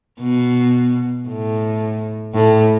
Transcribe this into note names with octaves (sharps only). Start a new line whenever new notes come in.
B2
A2
A2